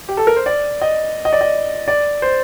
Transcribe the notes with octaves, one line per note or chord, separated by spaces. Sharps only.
G4
A4
A#4
C5
D5
D#5
D#5
D5
D#5
D5
C5